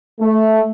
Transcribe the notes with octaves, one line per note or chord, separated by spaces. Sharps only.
A3